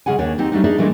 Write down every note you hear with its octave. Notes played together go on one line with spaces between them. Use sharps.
C#3 G#3 G#4 F#5 G#5
D#2 D4 C#5 G#5
C4 D#4 G4
G3 A3 D4 D#4
D4 D#4 G#4 D5 E5
A#2 E3 G#3 A3 D4